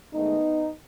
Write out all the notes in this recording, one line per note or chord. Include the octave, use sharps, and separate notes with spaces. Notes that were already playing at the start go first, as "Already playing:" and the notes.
G#2 D#3 A3 B3 D#4